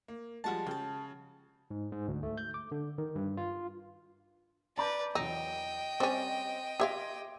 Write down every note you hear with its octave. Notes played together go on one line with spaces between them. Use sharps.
A#3
F3 G3 G#3 F#4 A5
C#3 G5 A5
G#2
G#2
D2
A3
G6
D6
D3
D#3
G2
F4
B4 D5 A5 A#5 G6
E2 F#3 D#4 D#5 G5
G3 C4 C#4
G4 E5 F5 C6 D6 G#6